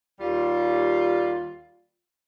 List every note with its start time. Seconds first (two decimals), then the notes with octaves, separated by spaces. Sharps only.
0.20 D#2 G3 F4